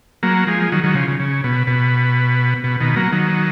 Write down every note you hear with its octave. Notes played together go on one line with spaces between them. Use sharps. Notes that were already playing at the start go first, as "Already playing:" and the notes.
F#3 A#3
F3 G#3
D#3 F#3
D#3 F#3
C#3 F3
C#3
C#3
B2
B2
B2
B2 D#3
F#3 A#3
D#3 F#3